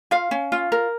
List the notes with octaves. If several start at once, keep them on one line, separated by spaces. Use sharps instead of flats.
F4 F5
C#4
F4
A#4